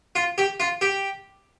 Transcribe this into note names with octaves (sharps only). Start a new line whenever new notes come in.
F4
G4
F4
G4